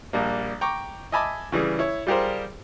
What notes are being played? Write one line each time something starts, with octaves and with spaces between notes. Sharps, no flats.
A#1 G3 A#3
G5 A#5 C#6 D6
D#5 E5 G#5 A5 B5 D6
C#3 E3 G3 G#4
E4 C#5
G3 F4 G4 G#4 A#4 C5